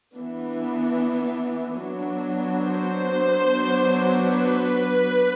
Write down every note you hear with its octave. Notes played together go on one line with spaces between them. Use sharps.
E3 B3 D4
F#3 B3 D4
C5
F#3 B3 D4
B4